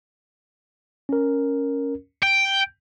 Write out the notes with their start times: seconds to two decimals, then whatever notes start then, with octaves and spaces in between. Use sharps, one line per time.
1.09 C#4 A#4
2.23 G5 G6